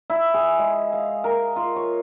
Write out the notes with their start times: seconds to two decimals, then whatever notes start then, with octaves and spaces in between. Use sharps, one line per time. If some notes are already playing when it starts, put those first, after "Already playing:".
0.10 E4
0.34 G#4
0.59 G#3
0.93 F5
1.24 A#4
1.56 F4
1.76 C#5